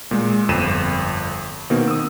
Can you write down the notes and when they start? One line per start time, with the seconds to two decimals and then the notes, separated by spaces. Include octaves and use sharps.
0.11 A#2 G#3
0.48 G1 F2 D#7 E7
1.70 B2 D#3 A#3 C4
1.88 D#6 E6